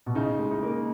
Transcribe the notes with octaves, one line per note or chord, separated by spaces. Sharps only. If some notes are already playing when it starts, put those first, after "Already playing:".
B2
C#3 D#4
G#3
D#4
A#3